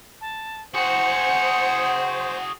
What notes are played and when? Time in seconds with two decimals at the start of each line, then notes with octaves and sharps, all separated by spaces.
0.21 A5
0.74 F#4 G#4 C5 F#5 C#7